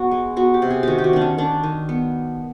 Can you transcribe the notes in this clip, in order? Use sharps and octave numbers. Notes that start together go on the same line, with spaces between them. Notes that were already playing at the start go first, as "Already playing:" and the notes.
Already playing: B3 F#4
G#3
B3 F#4
G4
C3
G#4
D#3 F#4 G4
G4
F#4
D#3 D4
C#4
D#3 D4
D#3
B3